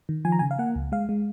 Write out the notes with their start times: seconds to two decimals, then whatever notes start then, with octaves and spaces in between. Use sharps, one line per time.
0.09 D#3
0.25 F3 G#5
0.32 A#5
0.39 C#3 G#5
0.51 F5
0.59 A#3 F#5
0.75 C#2
0.92 G#3 F5
1.09 G#3